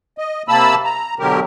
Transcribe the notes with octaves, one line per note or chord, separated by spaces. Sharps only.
D#5
C3 A#3 A5 B5 E6
A#5
B2 D3 F#3 G4 A#4